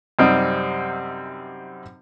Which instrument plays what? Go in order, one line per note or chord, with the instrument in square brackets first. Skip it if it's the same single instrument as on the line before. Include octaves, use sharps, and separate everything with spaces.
[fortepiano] F#2 C3 G3 C4 D#4